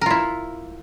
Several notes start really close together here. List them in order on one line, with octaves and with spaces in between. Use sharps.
A#4 F4 E4